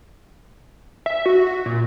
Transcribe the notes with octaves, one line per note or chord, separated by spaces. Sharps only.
E5
F#4
A#2